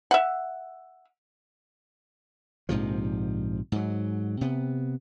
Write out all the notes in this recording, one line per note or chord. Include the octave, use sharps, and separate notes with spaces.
E5 F#5
A#1 G#2 C3 F3
G#2 F#3
C3 B3